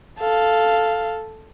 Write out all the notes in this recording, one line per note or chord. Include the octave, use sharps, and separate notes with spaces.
A4 F5